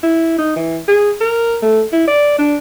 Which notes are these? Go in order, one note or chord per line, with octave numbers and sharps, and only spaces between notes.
E4
D#4
E3
G#4
A#4
A3
E4
D5
D4